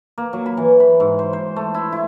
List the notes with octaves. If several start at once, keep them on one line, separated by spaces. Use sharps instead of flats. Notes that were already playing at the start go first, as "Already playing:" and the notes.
A#3
F#3
B5
E3
B5
G#2
C5
C5
A3
E4
E4